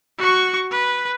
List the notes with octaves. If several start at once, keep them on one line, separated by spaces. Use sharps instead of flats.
F#4 C#6
B4